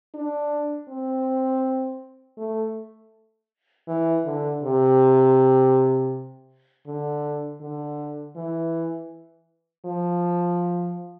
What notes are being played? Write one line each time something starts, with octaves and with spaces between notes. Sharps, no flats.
D4
C4
A3
E3
D3
C3
D3
D3
E3
F3